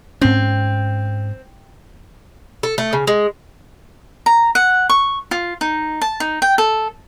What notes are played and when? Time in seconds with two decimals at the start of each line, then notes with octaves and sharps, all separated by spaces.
0.21 G#2 C4 C#4
2.63 A4
2.78 A3
2.93 C#3
3.07 G#3
4.26 A#5
4.55 F#5
4.90 C#6
5.31 F4
5.61 D#4
6.02 A5
6.20 D#4
6.42 G5
6.58 A4